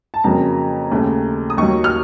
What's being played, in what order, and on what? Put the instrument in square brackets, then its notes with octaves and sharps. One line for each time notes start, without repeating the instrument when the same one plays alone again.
[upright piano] A5
F2 C#3 F#3 A#3 A#5
D#2 C#3 A3
D#6
D#2 D#3 F#3 C#6
F6